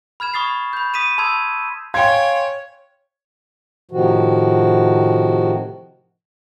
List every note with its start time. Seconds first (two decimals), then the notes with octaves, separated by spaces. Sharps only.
0.20 B5 F6 G#6 E7
0.34 B5 C#6 D#6 A6 C7
0.73 B5 G6
0.94 D#6 B6 D#7 E7
1.18 A5 B5 C6 D#6 E6 G#6
1.94 C#5 F5 G5 G#5 C6 G#6
3.91 A2 C3 D#3 F3 F#4